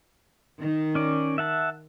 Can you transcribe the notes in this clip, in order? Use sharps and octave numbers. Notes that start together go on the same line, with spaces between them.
D#3
C#4 D5
E5 F#5 A5